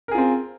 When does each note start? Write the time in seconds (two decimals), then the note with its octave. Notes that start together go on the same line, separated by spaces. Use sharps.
0.08 A#4
0.11 G#4
0.15 F4
0.18 C4